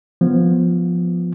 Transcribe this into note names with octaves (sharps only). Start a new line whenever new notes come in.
F3 B3